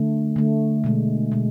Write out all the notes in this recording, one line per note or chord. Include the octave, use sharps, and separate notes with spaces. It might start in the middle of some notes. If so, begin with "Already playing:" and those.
Already playing: D3 A3
D3 A3
B2 G#3
B2 G#3